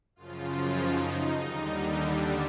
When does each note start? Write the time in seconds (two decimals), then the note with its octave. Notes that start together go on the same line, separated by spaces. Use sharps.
0.16 F#2 C#3 F3 F4
0.79 D#4
1.41 D#2 D3 G3
2.04 D4